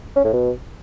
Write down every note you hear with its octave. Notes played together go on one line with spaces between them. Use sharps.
C#4
A2
B2